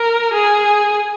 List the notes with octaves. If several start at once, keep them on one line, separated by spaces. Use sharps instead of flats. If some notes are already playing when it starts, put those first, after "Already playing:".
Already playing: A#4
G#4